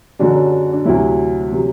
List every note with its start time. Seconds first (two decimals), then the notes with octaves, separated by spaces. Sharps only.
0.19 F#1 F#2 D3 F#3 D4 F#4
0.72 D4
0.85 D2 C3 F#3 E4
1.52 C3 F#3